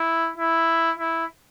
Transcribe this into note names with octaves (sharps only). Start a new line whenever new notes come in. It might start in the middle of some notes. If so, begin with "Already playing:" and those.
Already playing: E4
E4
E4